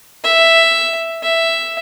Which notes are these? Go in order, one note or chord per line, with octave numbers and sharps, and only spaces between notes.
E5
E5